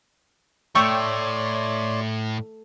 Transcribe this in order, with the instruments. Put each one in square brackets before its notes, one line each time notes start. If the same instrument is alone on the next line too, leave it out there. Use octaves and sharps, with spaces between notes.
[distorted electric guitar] A2 [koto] A3 [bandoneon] C#5 D5 C6 [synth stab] G5 C#6